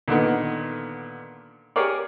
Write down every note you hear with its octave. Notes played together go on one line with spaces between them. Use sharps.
A#2 D3 D#3 B3
G4 G#4 A#4 C#5 D5